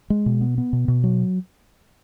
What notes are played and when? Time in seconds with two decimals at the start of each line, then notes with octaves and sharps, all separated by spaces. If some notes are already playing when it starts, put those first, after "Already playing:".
0.10 G#3
0.26 B2
0.41 B3
0.58 B3
0.73 B2
0.88 B2
1.04 F#3